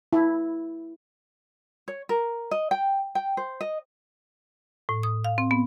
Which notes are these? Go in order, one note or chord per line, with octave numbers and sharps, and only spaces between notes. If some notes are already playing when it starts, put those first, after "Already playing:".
E4
C#5
A#4
D#5
G5
G5
C5
D#5
A2
D#6
F5
C4
B3